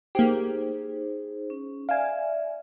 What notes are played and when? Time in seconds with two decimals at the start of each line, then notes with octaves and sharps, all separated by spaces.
0.15 A#3 D#4 G4 G#4 C5
1.50 C#4
1.89 D5 E5 F5 G#5